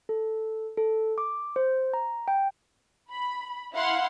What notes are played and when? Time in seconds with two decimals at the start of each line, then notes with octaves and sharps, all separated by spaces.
0.09 A4
0.77 A4
1.18 D6
1.56 C5
1.94 A#5
2.28 G5
3.10 B5
3.74 E4 F5 F#5 C6